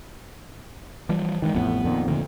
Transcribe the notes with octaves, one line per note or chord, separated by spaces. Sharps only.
E3 F3 G3
G2 D#3 E3 G#3
A1 F2 A2 B3
F2 A#2 D#3
D2 D3